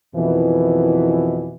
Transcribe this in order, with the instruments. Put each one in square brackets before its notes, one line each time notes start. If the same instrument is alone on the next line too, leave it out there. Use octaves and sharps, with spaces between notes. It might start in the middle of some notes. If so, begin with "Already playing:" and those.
[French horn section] F2 B2 D#3 E3